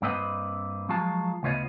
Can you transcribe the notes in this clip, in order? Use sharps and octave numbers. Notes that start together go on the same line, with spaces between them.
G2 A#3 C4 B4 D#5 F#5
F3 F#3 G#3 F4 A5
D2 C#3 B3 F4 C#5 D#5